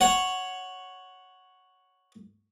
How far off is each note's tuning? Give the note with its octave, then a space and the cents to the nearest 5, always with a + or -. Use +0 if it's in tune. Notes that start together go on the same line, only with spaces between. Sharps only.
C#5 +0 F#5 +0